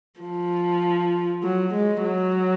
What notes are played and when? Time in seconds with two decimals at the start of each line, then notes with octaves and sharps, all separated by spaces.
0.20 F3
1.43 F#3
1.74 G#3
2.04 F#3